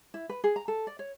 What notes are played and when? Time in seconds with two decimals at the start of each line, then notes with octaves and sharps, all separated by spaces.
0.14 E4
0.29 B4
0.44 G#4
0.56 A#5
0.68 A4
0.87 D5
0.99 C#5